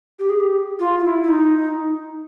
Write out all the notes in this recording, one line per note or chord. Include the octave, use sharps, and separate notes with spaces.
G4
G#4
G4
F4
F4
E4
E4
D#4